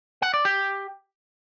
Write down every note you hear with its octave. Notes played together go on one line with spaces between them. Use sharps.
F#5
D5
G4